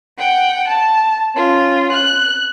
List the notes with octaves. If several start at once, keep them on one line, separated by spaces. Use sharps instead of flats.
F#5 G5
A5
C#4 F4
F#6